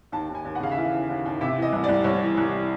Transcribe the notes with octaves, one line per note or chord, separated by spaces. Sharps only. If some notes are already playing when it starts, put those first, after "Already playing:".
D#2 A5
D#2
G#5
D#2
F#5
C#3 F5
E5
E3 F5
D#2
D#2
D#2
C3 E5
E3
D#5
C2
D5
C2
C2 C#5
E3
C2